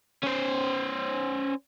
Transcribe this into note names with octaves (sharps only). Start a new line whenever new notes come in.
C#4 C5